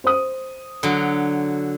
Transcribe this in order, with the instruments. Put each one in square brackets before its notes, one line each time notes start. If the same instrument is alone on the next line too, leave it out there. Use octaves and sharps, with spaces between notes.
[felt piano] C5 D#6
[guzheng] D3 F#3